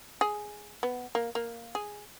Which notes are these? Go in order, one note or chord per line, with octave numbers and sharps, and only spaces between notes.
G#4
B3
A#3
A#3
G#4